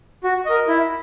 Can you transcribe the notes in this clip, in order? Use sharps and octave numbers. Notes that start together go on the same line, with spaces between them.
F#4
A#4 D#5
E4